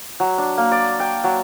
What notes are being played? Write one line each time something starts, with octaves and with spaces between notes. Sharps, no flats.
F#3
D4
A#3
D5
G5
F#3